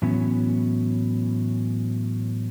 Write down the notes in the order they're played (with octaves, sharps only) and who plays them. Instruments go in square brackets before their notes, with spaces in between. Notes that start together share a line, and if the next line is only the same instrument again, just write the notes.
[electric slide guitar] A2 E3 F#3 B3 C#4